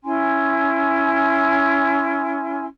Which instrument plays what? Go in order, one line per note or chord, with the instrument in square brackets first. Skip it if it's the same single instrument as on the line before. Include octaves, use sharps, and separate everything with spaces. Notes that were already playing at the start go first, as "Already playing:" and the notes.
[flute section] C#4 E4 G#5 C6